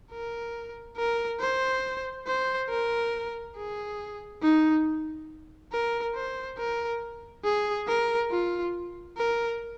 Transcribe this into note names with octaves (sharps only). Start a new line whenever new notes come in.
A#4
A#4
C5
C5
A#4
G#4
D#4
A#4
C5
A#4
G#4
A#4
F4
A#4